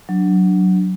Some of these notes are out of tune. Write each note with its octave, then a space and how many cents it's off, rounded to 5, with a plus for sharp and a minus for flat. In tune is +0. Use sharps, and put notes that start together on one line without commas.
F#3 +0 D4 +0